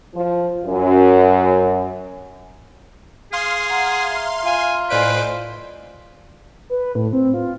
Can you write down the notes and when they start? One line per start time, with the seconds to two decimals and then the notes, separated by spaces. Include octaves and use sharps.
0.14 F3
0.65 F#2
3.33 G#4 F5 C6
3.69 F#5 A#5
4.11 E5 A#5
4.46 F4 G#5
4.90 A2 B4 C5 D5 D#5 G#5 D7
6.70 B4
6.95 A2
7.13 C4
7.34 F4